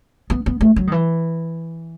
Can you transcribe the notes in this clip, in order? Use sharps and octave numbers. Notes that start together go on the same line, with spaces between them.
B3
B3
A3
F#3
D#3
E3